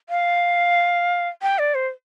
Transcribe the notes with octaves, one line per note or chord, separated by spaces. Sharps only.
F5
G5
D5
C5